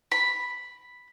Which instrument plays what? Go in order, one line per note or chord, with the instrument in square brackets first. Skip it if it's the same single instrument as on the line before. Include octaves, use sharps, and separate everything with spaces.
[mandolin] B5